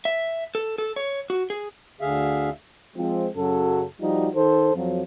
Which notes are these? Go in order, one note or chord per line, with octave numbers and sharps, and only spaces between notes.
E5
A4
A4
C#5
F#4
G#4
D2 D3 G#4 E5 F5
F3 G#3 C4
F#2 C#3 F#3 A4
F3 G3 D#4 F#4
D#3 A4 C5
F2 F3 F#3